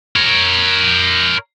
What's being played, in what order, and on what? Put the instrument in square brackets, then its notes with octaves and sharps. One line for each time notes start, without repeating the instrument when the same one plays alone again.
[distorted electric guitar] A#4 C#5